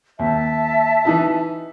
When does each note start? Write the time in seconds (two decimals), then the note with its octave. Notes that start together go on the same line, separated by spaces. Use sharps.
0.19 D#2 E5 A5
1.05 E3 D#4 E4